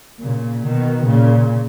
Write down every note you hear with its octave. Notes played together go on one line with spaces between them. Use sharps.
A#2 C#3
B2 D#3
A#2 C#3